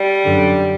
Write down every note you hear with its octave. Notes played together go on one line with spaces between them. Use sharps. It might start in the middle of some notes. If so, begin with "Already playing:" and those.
Already playing: G3
F#2 D3